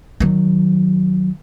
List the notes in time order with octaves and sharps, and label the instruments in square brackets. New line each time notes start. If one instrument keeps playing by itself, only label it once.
[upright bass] D#3 F#3